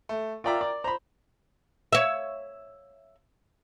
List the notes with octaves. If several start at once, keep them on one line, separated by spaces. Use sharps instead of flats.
A3
F4 A#4 D5 E5 G5 A#5
D5
C5 A#5 B5
C#5 E5